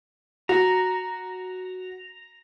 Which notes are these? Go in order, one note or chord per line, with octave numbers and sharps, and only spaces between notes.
F#4 A#5